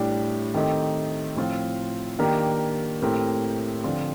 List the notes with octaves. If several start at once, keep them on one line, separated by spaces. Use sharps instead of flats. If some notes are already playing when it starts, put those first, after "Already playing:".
Already playing: A2 G3 D4 G4
D#3 A3 C4 D#4 G4
A2 F3 C4 F4
D#3 A#3 D4 G4 A#4
A2 A3 C4 G4 A#4
D3 F3 C4 F4